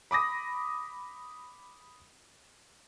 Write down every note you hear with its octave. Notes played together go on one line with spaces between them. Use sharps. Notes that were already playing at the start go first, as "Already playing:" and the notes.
B5 D6 D#6 A#6